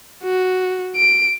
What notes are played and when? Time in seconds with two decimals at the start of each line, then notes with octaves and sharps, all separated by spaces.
0.23 F#4
0.97 D7